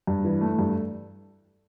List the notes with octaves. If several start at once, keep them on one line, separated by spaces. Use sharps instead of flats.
G2
E3
A3
G2